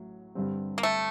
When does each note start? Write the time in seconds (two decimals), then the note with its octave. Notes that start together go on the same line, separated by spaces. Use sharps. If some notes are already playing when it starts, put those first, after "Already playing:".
Already playing: A1 A2 F#3
0.35 G2 D3 G3 C4
0.78 A#3
0.83 A3